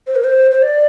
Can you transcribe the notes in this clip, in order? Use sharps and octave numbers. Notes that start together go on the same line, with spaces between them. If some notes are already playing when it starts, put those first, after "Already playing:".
C5
A#4
C5
C5
D5